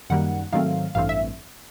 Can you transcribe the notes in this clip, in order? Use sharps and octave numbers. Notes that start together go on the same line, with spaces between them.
F#2 D#3 G3 A#3 F#5
G#2 D#3 F#3 A3 C4 F5
A1 G2 E3 A3 C4 F5
E5